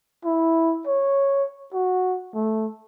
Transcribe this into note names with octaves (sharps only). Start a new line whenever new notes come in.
E4
C#5
F#4
A3